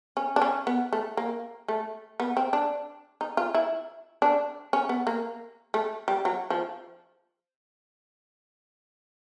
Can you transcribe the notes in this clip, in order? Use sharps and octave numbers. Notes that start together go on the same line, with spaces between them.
C#4
D4
C#4
B3
A3
A#3
A3
B3
C4
D4
D#4
F4
E4
D4
C#4
B3
A#3
A3
G3
F#3
F3